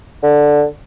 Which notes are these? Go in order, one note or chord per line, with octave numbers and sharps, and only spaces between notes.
D3